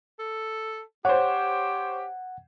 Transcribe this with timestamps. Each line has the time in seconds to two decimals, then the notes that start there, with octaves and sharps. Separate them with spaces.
0.19 A4
1.05 G4 C5 C#5 F#5